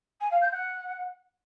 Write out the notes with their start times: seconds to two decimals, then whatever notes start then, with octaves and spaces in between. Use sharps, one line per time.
0.20 G#5
0.31 F5
0.41 G6
0.52 F#5